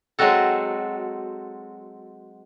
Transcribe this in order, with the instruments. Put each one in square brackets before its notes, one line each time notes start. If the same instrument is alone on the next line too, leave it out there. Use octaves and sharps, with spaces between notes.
[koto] F#3 G#3 C4 F#4 A4